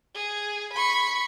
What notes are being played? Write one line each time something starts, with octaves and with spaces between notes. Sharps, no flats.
G#4
B5 C#6